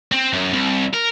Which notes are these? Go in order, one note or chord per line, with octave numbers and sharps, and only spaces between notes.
C4
F#2
C2
A#4